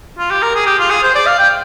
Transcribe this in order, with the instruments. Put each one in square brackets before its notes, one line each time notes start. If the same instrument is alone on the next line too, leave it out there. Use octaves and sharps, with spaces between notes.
[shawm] F4
G4
A#4
G#4
G4
F4
G#4
C5
D5
F5
G5